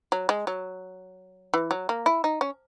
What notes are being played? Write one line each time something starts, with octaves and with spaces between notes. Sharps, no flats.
F#3
G#3
F#3
E3
F#3
A#3
E4
D#4
C#4